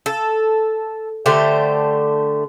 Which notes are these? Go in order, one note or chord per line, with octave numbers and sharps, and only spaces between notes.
A4
D3 A3 G4 C5